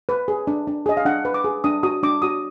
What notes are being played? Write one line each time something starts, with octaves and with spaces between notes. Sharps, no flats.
B4
G#4
D4
D4
G#4 D#5
F5
D4 F#5
B4
D6
G#4
D4 D#6
F#4 D#6
D4 D6
F#4 D#6